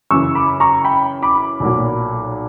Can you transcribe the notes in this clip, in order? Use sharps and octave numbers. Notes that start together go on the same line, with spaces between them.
F#2 C#3 E3 C#6 E6
B5 D6
A#5 C#6
G5 B5
B5 D6
B1 A#2 F#3